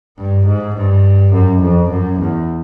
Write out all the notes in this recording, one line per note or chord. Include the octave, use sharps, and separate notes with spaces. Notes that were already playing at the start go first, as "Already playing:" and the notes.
G2
G#2
G2
F#2
F2
F#2
E2